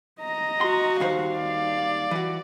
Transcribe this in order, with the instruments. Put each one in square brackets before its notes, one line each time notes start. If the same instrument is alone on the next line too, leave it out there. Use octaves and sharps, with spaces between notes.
[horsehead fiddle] D#5 A#5
[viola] F#4 [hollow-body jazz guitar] C6
[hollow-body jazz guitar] D#2 D#3 C5 [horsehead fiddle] G3 F5
[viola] D5
[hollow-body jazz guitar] E3 F#4